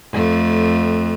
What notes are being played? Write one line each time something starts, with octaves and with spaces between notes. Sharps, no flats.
F2 A3